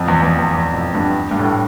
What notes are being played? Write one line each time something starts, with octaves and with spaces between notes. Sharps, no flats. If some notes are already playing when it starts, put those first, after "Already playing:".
Already playing: F2
E2
E2
E2
E2
F2
G2
G2
A2